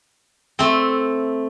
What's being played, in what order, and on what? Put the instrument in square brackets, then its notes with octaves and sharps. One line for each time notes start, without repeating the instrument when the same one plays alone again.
[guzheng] A3 C4